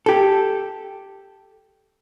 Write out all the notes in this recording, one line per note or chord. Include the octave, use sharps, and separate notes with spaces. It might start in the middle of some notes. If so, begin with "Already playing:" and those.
G4 A4